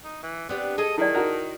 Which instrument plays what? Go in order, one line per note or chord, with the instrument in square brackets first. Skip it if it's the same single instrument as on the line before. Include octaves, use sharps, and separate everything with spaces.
[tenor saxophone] D#4
E3
[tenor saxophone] B3 [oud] C4 D4 G4
[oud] G#4 A4 [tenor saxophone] D#5
[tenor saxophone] D#3 [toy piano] E4 D5
[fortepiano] D#4 F#4 A#4